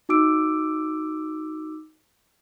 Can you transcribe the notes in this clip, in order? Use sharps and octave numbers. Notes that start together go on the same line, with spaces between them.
D#4 F#4 D6 E6 D7